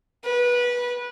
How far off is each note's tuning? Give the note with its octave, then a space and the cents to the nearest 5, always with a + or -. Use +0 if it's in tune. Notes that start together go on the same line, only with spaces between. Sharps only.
B4 -20